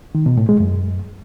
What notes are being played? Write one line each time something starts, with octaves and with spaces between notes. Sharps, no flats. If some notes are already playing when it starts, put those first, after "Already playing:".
D#3
B2
A2
G#3
F#2